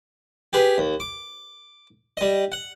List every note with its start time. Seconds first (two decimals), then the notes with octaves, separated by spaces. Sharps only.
0.53 G4 G#4 B4
0.78 D#2
1.00 D6
2.17 G3 D#5
2.52 F#5